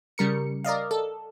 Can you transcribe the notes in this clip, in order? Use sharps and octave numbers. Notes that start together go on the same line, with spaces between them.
C#3 G3 A#4 C#7
A#4 D5 D#5 F5
A4